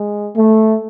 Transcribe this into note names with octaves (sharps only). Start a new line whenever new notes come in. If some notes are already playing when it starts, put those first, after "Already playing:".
Already playing: G#3
A3